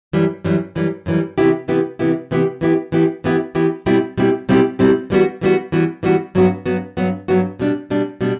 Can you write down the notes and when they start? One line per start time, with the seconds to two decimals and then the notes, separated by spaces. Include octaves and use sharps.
0.13 F#2 E3 G3
0.45 F#2 E3 G3
0.75 F#2 E3 G3
1.06 F#2 E3 G3
1.38 C3 E3 B3 E4 G4
1.68 C3 E3 B3 E4 G4
1.99 C3 E3 B3 E4 G4
2.31 C3 E3 B3 E4 G4
2.61 E3 B3 E4 G4
2.92 E3 B3 E4 G4
3.24 E3 B3 E4 G4
3.55 E3 B3 E4 G4
3.86 B2 G3 C4 E4 G4
4.17 B2 G3 C4 E4 G4
4.49 B2 G3 C4 E4 G4
4.79 B2 G3 C4 E4 G4
5.10 E3 G3 B3 F#4
5.41 E3 G3 B3 F#4
5.72 E3 G3 B3 F#4
6.03 E3 G3 B3 F#4
6.35 G2 F#3 B3 F#4
6.66 G2 F#3 B3 F#4
6.97 G2 F#3 B3 F#4
7.28 G2 F#3 B3 F#4
7.59 B2 G3 D4
7.90 B2 G3 D4
8.21 B2 G3 D4